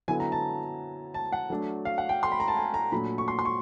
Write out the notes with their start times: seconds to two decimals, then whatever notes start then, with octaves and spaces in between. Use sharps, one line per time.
0.08 D3 F#3 B3 E4 G#5
0.20 A#5
0.32 A5
1.14 A5
1.32 F#5
1.50 F#3 A3 D4
1.85 F5
1.98 F#5
2.09 G5
2.23 C6
2.32 B5
2.40 A#5
2.48 A5
2.57 G#5
2.74 A#5
2.92 A#2 F#3 A3 D4 B5
3.18 C#6
3.28 C6
3.39 C6
3.45 C#6